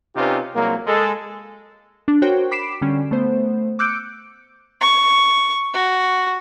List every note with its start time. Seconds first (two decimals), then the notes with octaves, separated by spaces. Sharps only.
0.16 C3 C#4 D#4 F4 G4 B4
0.55 C2 F#3 G#3 A#3
0.87 G#3 A4
2.08 D4
2.22 F#4 A#4 C5 C#5 G5
2.51 B5 D6 B6 C7 D7 E7
2.81 D3 G3 C#4
3.11 A3 B3 C5
3.79 D6 E6 F#6 G6 C#7 D7
4.81 C#6
5.74 F#4